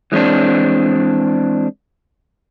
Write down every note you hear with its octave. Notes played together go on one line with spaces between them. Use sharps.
E3 G#3 B3 C4 D4